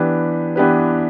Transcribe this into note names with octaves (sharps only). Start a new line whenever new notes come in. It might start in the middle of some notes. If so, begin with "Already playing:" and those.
Already playing: E3 B3 D4 G4 B4
E3 B3 D4 G4 B4